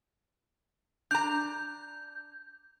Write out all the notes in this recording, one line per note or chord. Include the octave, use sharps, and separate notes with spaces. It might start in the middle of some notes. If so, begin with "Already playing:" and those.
D4 A#5 G6